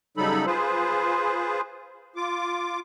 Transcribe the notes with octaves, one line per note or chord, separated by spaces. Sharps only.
C#3 F#3 G3 D#4 A4 B5
F4 G#4 B4 C5
F4 D6